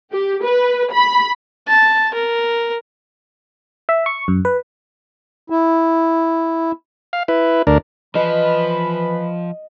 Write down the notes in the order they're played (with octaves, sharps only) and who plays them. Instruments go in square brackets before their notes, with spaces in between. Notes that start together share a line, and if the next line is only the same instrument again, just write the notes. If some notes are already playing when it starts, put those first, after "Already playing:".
[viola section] G4
B4
B5
[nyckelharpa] A5
A#4
[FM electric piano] E5
C#6
F#2
B4
[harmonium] E4
[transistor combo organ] F5
E4 B4
D2 D4 A#4
[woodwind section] E3 B4 B5 [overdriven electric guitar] F3 [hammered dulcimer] D#5